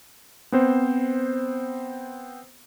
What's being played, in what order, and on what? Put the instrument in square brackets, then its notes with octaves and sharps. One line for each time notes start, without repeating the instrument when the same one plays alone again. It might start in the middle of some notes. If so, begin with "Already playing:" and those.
[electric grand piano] B3 C4 C5